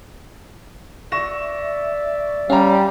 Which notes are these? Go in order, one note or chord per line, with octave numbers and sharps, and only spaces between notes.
D5 E5 C#6 A#6 E7
G3 C#4 F5 A#5